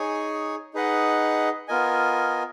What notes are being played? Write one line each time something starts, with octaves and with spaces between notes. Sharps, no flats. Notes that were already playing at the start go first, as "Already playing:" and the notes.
Already playing: D#4 G#4 C#5 G#5
D#4 G#4 B4 D#5 F#5
B3 F4 A#4 D#5 G#5